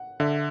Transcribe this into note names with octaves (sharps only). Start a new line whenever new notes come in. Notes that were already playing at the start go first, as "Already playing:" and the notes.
Already playing: F#5
D3 E5